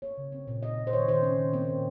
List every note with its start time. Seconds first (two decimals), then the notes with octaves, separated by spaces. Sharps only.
0.02 A#3 C#5
0.18 C#3
0.32 C4
0.47 A#2
0.63 C4 D#5
0.78 A#2
0.87 C5
0.93 D#3 C#5
1.07 D#3 C5
1.23 C4 C#4
1.38 D#3
1.53 A#3 C4
1.68 A#2